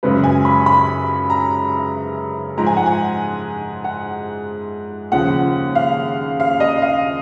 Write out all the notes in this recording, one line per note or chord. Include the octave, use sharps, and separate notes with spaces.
F#2 C#3 G#3 B4
G#5
B5
B5
A#5
G#2 F3 G#3 A#5
G#5
F#5
G#5
F#5
D#2 C#3 F3 F#5
F5
F5
D#5
F5